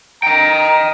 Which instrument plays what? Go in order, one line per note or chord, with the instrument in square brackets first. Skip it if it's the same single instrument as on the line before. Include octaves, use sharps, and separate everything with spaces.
[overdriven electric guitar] D#5 G5 [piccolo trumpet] A#5